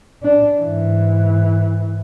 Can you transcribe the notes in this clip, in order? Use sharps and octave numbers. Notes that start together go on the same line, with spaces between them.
D4
G#2 E3